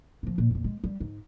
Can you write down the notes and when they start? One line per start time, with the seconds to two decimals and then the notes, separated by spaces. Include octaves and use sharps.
0.23 A#2 F3
0.38 A#2
0.51 F2 A#2
0.64 G#3
0.84 G3
1.00 G#2